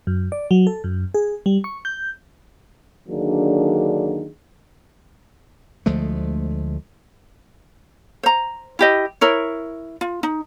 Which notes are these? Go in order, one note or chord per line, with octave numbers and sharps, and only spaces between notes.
F#2
D5
F#3
A4
F#2
G#4
G3
C#6
G6
D3 D#3 F#3 A#3 D4 G#4
D2 F3 G#3 A3
C5 A#5
E4 G4 D#5
E4 A#4 C#5
F4
D#4